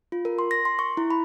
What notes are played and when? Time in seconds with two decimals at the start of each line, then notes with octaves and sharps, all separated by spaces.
0.12 F4
0.25 A#4
0.39 C6
0.51 A#6
0.65 C6
0.79 C#6
0.97 E4
1.11 B5